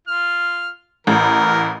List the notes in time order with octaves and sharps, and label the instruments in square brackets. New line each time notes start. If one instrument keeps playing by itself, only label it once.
[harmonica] F4 F6
[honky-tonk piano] A1 [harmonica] E3 A#4